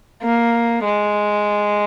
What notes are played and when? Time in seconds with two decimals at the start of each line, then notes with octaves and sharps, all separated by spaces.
0.23 A#3
0.84 G#3